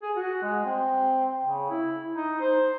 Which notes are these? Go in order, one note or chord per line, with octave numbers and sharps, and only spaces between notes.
G#4
F#4
G#3
C4
C#3
E4
D#4
C5